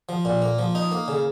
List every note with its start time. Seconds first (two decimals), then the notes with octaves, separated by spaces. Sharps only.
0.09 F3
0.25 A#2
0.42 A#3
0.58 F3
0.75 D#4
0.91 A#3
1.08 C#3